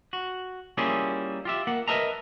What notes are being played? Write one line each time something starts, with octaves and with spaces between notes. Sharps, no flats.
F#4
G3 A#3 C#4 E4 F4 G#4
F4 G4 E5
A#3 F#5
A#4 B4 D#5 E5 A5 A#5